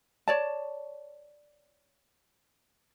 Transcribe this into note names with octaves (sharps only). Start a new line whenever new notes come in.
C#5 D5 A5